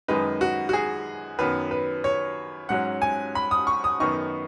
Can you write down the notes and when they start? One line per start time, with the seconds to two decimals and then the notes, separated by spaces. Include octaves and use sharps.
0.08 F#2 D#3 G#3 D#4 B4
0.41 F#4
0.69 F#4
0.73 G#4
1.39 F#2 D#3 F#3 B3 B4
1.71 B4
2.04 C#5
2.69 G#2 F#3 C#4 F#5
3.02 G#5
3.35 B5
3.51 D#6
3.67 C#6
3.84 D#6
4.00 F#2 D#3 B3 D#4 C#6